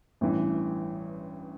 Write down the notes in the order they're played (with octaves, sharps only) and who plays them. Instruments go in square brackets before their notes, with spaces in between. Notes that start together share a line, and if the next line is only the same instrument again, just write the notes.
[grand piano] A1 G2 E3